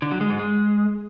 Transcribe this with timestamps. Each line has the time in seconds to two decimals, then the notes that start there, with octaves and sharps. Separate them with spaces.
0.02 D3
0.11 F#3
0.21 G#3
0.30 G#2
0.39 G#3